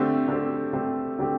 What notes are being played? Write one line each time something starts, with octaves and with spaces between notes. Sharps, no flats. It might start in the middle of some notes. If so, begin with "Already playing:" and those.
Already playing: D3 A3 C4 G4
D3 A3 C4 G4
D3 A3 C4 G4
D3 A3 C4 G4